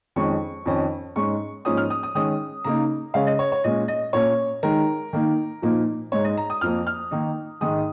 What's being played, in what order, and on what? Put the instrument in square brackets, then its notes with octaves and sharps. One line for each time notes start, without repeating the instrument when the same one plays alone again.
[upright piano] F2 D#3 G#3 C#4 C#6
F2 D#3 C#4
G#2 G#3 C#4 C#6
G#2 F3 A#3 C#4 D#6
F6
D#6
D#6
D#3 G#3 C#4 D#6
C#3 A#3 D#4 A#5
C#3 G#3 C#4 F5
D#5
C#5
C#5
A#2 G#3 C#4 D#5
D#5
A#2 A#3 C#4 C#5
D#3 G#3 D#4 A#4
D#3 A#3 D#4
A#2 F3 A#3 D#4
G#2 G#3 D#4 C#5
D#5
A#5
D#6
F2 F3 A#3 F6
F6
D#3 A#3 D#4
G#2 D#3 G#3 D#6